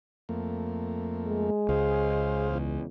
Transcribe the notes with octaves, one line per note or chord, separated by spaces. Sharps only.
F2 A3 A#3
G#3
C#2 G#4 C5 F5
E2